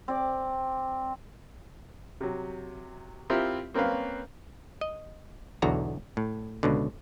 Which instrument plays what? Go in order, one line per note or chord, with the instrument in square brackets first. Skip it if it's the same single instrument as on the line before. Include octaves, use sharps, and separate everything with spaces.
[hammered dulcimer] C4 D5
[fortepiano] C3 F#3
C4 E4 F4 G4 A#4
A#3 C4 C#4 B4 F5
[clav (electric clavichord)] D#5
B1 E2 D3 F#4 A#5
A2
C#2 B2 D3